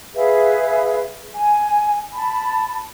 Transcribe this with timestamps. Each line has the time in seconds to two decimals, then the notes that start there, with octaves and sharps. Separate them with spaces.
0.15 G#4 B4 E5 F5
1.36 G#5
2.15 A5 B5